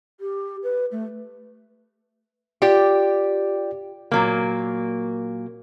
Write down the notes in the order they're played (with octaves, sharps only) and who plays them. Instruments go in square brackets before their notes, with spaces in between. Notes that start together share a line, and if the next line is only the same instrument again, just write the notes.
[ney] G4
B4
A3
[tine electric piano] F4 D5 G5 [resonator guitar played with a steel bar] G4
[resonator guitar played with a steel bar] A#2 F#3 A#3